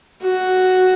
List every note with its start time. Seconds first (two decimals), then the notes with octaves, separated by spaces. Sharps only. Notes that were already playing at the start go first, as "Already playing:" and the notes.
0.23 F#4